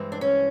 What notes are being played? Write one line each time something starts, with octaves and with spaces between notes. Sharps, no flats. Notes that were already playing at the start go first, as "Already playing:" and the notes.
Already playing: G2 E3 G#3 C4
D4
C#4